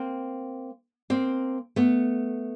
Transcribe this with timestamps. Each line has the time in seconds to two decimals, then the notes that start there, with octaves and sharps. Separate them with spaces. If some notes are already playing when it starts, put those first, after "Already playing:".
Already playing: A#3 C4
1.10 A#3 C4
1.76 A3 B3